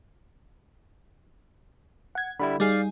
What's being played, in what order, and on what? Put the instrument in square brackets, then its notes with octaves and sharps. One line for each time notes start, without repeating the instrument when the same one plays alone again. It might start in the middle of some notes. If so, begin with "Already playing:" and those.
[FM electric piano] F#5 G#6
[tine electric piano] D3 G3 E4 [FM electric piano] B5
[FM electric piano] G3 D#4 G#4 [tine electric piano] D5 F5 C7